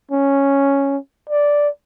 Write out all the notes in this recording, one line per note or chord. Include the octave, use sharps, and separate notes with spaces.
C#4
D5